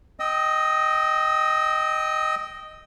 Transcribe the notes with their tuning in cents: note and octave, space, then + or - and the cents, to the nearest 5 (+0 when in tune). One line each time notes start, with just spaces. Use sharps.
D#5 +0 G5 -10 E6 -40